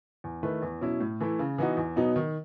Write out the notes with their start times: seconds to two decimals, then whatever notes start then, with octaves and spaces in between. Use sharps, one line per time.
0.24 E2
0.43 D#3 A3 E4 B4
0.62 E2
0.81 B2 F#3 C#4 E4
1.00 A2
1.20 E3 A3 E4
1.39 C#3
1.58 E3 B3 D#4 F#4
1.77 E2
1.96 B2 F#3 B3 D#4
2.16 D#3